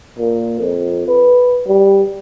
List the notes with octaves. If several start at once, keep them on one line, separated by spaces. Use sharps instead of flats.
A#2
F2
B4
G3